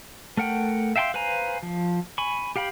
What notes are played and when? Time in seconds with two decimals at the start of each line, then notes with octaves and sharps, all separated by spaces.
0.37 A3 A#4 F#5 G5
0.96 E5 F5 G5 G#5 C6
1.14 B4 C5 F5 G#5 A#5
1.63 F3
2.18 G#5 B5 C#6
2.56 G4 F5 G5 B5